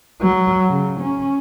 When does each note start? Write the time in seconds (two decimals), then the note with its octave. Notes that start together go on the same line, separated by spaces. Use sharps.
0.22 F#3
0.68 C#3
1.01 C#4